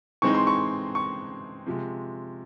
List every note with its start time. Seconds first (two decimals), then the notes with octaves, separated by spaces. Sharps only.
0.22 E3 G#3 C4 D#4 C#6
0.34 C6
0.47 C#6
0.95 C#6
1.66 C3 F3 G#3